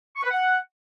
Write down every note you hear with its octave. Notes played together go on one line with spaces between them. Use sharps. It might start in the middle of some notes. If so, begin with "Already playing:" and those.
C#6
B4
F#5